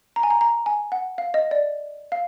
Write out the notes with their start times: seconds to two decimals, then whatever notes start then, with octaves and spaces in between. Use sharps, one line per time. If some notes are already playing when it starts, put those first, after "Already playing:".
0.16 A#5
0.23 G#5
0.30 A#5
0.41 A#5
0.66 G#5
0.92 F#5
1.18 F5
1.34 D#5
1.51 D5
2.12 F5